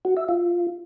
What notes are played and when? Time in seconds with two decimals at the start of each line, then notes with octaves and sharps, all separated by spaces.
0.05 F#4
0.17 E5
0.29 F4